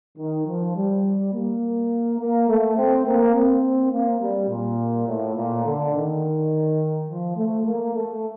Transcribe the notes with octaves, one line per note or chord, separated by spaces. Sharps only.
D#3
F3
G3
A#3
A#3
A3
C4
A#3
C4
A#3
G3
A#2
A2
A#2
D3
D#3
F3
A3
A#3
A3